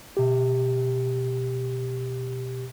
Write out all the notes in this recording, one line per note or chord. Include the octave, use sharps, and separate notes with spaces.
B2 G4